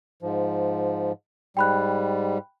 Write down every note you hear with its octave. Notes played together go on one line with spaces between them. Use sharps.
G#2 F3
G#2 G3 G5 B5 F#6